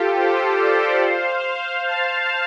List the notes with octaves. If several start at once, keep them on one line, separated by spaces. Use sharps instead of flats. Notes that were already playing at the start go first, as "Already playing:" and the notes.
Already playing: F4 G4 A4
G4 C5
A4 D5
C5 F5
F5 A5